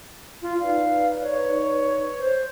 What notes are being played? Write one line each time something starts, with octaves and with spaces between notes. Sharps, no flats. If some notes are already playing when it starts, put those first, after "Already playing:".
F4
D#4 B4 D5 F5
C#5
C5